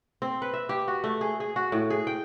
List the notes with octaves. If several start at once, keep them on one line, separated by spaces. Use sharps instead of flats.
C4
B4
E5
G4
F#4
A3
G#4
G#4
F#4
A2
G#4
G5